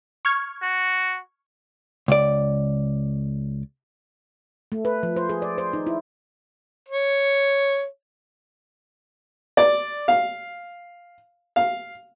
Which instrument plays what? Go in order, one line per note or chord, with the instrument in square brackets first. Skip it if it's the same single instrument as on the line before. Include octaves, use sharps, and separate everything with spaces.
[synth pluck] C#6 F6 G#6
[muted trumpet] F#4
[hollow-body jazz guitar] C#2 D5
[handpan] A3
B4
F3
C5
G#4
D5
C5
D#4
E4
[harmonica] C#5
[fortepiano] D5
F5
F5